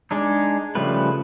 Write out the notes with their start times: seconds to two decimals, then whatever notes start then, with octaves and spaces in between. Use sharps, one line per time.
0.11 G#3 D4 D#4
0.75 C#3 F3 G3 A3 B4